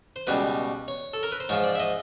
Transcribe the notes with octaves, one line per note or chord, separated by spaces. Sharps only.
C5
C#2 B2 G3 B4
C#5
A4
A#4
B4
C5
G#2 F3 C#5
D5
E5
D#5